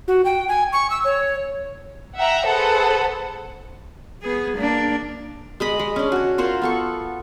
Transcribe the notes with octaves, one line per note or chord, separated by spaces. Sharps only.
F#4
G5
G#5
C#6
E6
C#5
E5 F#5 G5 A#5
G#4 A4 B4 C5 F#5
B3 G#4
A#3 D4
G#3 D#5 B5
G#3
C#4 D4
F#4 C#5
F4 A#4 C5 F#5
B3 A4 C#6